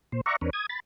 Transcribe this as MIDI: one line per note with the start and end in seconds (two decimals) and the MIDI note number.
0.12 0.21 46
0.12 0.21 72
0.26 0.36 74
0.26 0.36 76
0.26 0.36 78
0.26 0.36 82
0.26 0.36 85
0.41 0.50 40
0.41 0.50 60
0.41 0.50 62
0.41 0.50 70
0.41 0.50 71
0.41 0.50 73
0.53 0.66 87
0.53 0.66 92
0.69 0.80 83
0.69 0.80 93